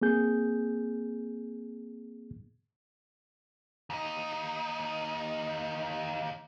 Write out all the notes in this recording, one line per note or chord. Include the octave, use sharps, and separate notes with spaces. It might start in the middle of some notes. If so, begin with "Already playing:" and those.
A#3 C4 G#4 G6
D#2 D#4